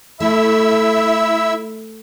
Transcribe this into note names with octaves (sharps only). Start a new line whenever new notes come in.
A3 E4 E5 E6